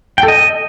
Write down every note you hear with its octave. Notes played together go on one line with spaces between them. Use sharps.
G5
A4
D#5